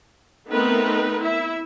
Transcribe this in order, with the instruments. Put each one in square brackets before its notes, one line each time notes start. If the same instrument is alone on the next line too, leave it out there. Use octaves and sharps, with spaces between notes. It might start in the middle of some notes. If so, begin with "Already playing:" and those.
[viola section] A3 B3 C4 D#4 A#4 B4
E4 E5